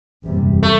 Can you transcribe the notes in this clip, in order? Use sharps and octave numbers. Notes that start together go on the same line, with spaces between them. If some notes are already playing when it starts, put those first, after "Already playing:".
F#1 E2 C3 G3
A3